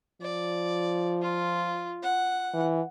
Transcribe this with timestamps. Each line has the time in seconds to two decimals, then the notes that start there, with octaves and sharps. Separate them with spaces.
0.21 F3 D5
1.22 F4
2.03 F#5
2.54 E3